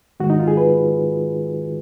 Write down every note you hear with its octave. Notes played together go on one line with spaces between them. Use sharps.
G#2 D#3 G#3 F#4
D#4
F4
G#4
B4